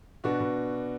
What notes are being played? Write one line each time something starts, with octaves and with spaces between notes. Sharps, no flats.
B2 D4 F#4
B2